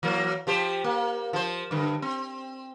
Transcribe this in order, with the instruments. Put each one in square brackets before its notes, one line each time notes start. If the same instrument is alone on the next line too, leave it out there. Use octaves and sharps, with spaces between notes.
[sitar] E3 F#3 A#3
F3 G4 C5
A#3
F3 C5
G2 D3
C4